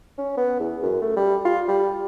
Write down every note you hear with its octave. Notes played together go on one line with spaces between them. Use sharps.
C#4
B3
E2
F#2
A3
G3
F4
G3